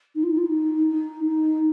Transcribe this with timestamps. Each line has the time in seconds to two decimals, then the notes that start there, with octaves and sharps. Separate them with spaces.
0.15 D#4
0.23 F4
0.31 D#4
0.38 F4
0.46 D#4
0.88 D#4
1.25 D#4